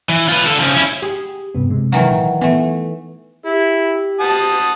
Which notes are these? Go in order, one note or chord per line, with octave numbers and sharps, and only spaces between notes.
E3
F4 B4
D3 A4
C#3 F3
C#4 E4
G4 G#4
G2 C3 B3
C3 G#3
D#3 E3 F#3
A#2
E3 A3 B3
E4 G4
F#5 A5 D#6